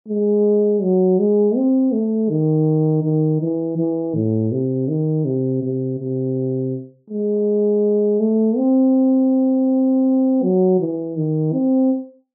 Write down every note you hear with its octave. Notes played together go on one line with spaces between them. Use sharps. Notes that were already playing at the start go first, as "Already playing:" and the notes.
G#3
F#3
G#3
C4
A3
D#3
D#3
E3
E3
A2
C3
D#3
C3
C3
C3
G#3
A3
C4
F#3
E3
D#3
C4